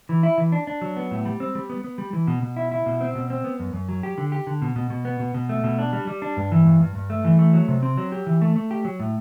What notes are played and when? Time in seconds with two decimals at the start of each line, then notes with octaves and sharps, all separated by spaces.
0.09 E3
0.23 E4
0.38 E3
0.52 D4
0.67 D4
0.82 F#3
0.97 B3
1.11 A2
1.26 G3
1.40 C4
1.55 G3
1.70 B3
1.84 B3
1.98 G3
2.13 E3
2.27 B2
2.42 B2
2.56 E4
2.72 E4
2.86 B2
3.01 C4
3.15 B2
3.30 C4
3.44 B3
3.59 F#2
3.73 F#2
3.89 F#3
4.03 G4
4.18 D3
4.32 G4
4.47 D3
4.62 B2
4.76 B2
4.90 B2
5.05 B3
5.20 B2
5.34 B2
5.49 A3
5.64 B2
5.79 D4
5.93 G3
6.07 G3
6.22 D4
6.37 G2
6.52 E3
6.66 G2
6.81 G2
6.95 G2
7.10 A3
7.25 E3
7.39 A3
7.53 F#3
7.68 C3
7.83 C4
7.98 F#3
8.12 G4
8.27 E3
8.42 A3
8.56 A3
8.71 G4
8.85 F#3
9.00 A2